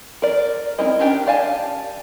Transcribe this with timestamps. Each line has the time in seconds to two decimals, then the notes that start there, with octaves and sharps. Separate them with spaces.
0.22 A#4 D5
0.79 C4 D#4 E4 A#4 D#5
0.99 C#4 D4 G4 A#4 G5
1.27 G4 D5 F5 G#5 A5